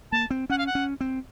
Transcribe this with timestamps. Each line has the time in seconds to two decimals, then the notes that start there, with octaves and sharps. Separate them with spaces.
0.12 A#3 A5
0.30 C4
0.50 C#4 F#5
0.58 F5
0.67 F#5
0.75 C#4
1.01 C4